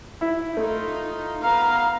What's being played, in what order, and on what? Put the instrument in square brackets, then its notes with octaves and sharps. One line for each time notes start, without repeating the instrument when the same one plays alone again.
[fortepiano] E4
[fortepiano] A3 [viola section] D#4 F4
[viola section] B3 F5 [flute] A#5